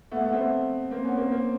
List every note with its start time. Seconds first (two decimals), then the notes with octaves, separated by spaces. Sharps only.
0.11 A3 B3
0.25 A3 B3
0.33 C4
0.38 A3 B3
0.91 A#3 C4
1.05 B3 C#4
1.18 A#3 C4
1.31 A#3 C4